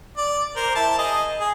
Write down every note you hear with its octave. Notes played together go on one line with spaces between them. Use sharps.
D5
A#4 C5
E4 A5
G#4 D#5
G#4